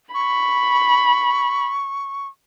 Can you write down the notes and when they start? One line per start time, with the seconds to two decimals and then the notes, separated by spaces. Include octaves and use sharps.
0.14 B5 C#6